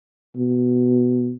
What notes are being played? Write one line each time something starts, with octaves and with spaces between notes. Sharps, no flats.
B2